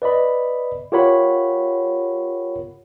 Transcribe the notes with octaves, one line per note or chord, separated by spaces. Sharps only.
B4 D5 D#5 B5
F4 G4 A#4 C#5 F#5 B5